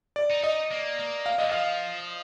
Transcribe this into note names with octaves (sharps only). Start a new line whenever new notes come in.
D5
D#4
D#4 D#5
A#3
A#3
F5
D#5
F3 F5